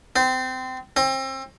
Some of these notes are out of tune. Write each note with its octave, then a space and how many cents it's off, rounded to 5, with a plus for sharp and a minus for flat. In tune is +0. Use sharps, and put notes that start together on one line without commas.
C4 -25
C4 +30